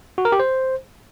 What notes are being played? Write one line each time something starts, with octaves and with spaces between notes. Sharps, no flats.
F#4
A#4
G4
C5